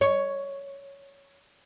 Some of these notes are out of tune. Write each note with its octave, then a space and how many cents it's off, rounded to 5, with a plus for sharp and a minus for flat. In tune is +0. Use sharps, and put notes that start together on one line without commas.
C#5 +5